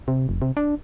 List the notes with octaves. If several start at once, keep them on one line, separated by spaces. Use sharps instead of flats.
C3
F1
C3
D4